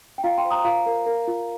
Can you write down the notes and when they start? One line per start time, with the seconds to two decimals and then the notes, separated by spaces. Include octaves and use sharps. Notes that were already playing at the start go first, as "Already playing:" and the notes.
0.18 G5
0.23 F4 F5 A#5
0.38 G5 C6
0.45 C5
0.51 A#5 D#6
0.64 F4 F5 A#5
0.86 A#4
1.06 A#4
1.28 F4